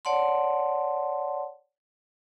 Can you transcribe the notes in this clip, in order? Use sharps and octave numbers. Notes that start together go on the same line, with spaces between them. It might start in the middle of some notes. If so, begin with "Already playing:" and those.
C#5 D5 F#5 A5 C6